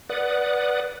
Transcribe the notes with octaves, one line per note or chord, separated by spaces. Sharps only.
B4 D5 F#5 D#6